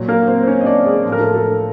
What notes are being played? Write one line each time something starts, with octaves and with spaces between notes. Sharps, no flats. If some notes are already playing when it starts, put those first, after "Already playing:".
Already playing: A#2 F#3
A#3 A#4
C4 C5
C5
C#4 C#5
D#5
D4 D5
G#3 G#4
A2 F3
A#4
A3 A4
A3 A4